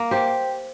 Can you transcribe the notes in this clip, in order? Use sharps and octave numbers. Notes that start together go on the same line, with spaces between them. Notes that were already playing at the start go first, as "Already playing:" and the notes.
Already playing: A#3
G4 C5